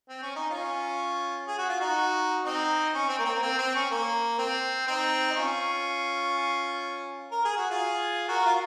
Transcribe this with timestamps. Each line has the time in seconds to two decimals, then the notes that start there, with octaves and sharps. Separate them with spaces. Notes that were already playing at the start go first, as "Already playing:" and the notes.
0.09 C4
0.22 C#4
0.36 D#4
0.50 C#4 F4
1.47 G#4
1.58 F#4
1.69 F4
1.80 D#4 F#4
2.44 C4 D#4
2.94 C#4
3.09 C4
3.19 A#3
3.25 C4
3.35 A#3
3.43 C4
3.58 C4
3.75 C#4
3.91 A#3
4.39 C4
4.87 C4 D#4
5.30 D#4
5.37 C#4 F4
7.31 A#4
7.45 G#4
7.57 F#4
7.70 F4 G#4
8.28 F#4 A#4
8.46 F4